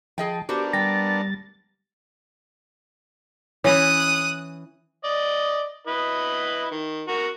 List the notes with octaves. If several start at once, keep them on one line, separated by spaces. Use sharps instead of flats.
F3 G#4 D#5 G5 A5
B3 D4 F#4 G4 A#4 C5 D6
G3 G5 A6 A#6
E3 C#4 E4 C#5 D#6 F#6
D5 D#5
E4 B4 D#5
D#3
F#4 A#4